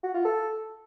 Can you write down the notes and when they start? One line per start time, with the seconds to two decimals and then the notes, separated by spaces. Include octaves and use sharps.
0.03 F#4
0.14 F4
0.25 A4